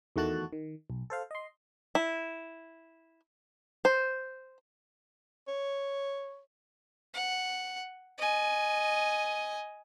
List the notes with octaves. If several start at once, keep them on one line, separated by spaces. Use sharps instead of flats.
E2 D#3 A3 F#4 A5 F#6
D#3
B1
A4 C5 F5
D#5 C6
E4
C5
C#5
F#5
D#5 G#5